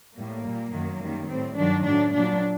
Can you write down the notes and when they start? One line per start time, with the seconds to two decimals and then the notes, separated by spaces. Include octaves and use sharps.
0.16 A2 G3 A#3
0.44 A#2 G3
0.72 F#2 D#3 F#3
1.00 F#2 D#3 G3
1.28 A2 G3 C4
1.56 G2 D#3 F#3 D4
1.84 A2 F#3 D4
2.13 A#2 F#3 D4